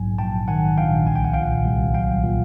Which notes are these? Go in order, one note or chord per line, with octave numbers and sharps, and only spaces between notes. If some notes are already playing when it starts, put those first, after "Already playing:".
Already playing: A#1 G#2 F#3 G#5
A#1 G5 A5
D#3 F#5 G#5
A#1 F5 G5
C2 G#5
G5
F#5
A#2 F5 G5
C2
F#3 F5 G5
A#2